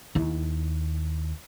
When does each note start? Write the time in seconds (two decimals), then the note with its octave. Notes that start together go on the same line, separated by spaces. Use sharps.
0.15 D#2 E4